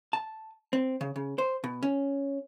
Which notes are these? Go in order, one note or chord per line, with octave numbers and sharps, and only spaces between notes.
A5
C4
C#3
C#3
C5
B2
C#4